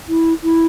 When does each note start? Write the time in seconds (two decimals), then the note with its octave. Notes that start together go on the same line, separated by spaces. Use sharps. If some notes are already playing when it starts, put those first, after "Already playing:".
0.09 E4
0.44 E4